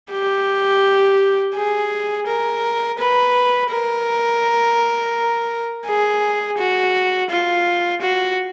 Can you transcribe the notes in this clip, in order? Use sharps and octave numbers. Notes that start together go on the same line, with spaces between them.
G4
G#4
A#4
B4
A#4
G#4
F#4
F4
F#4